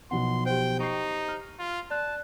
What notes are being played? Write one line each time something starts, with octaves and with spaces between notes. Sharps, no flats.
B1 F3 B3 F#5 C6
G4 C5 G5
D#4 C#6 C7
F6
F4
D5 A5 F#6